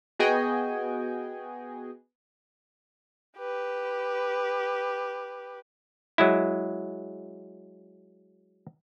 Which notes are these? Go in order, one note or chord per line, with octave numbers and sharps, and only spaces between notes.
B3 F#4 G#4 D#5 G5 G#5
G4 B4
F#3 G#3 E4